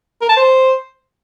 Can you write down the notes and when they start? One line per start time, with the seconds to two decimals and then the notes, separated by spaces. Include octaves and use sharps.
0.21 A#4
0.29 A5
0.36 C5